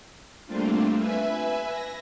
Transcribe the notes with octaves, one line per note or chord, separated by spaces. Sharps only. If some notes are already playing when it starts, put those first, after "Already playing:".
G3 A3 A#3 C4 D4 F4
B4 E5 G#5
A#6